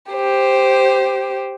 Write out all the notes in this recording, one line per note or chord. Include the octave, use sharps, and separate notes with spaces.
G4 C5